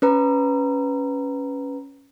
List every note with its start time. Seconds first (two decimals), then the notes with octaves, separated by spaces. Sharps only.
0.02 C#4 B4 A#5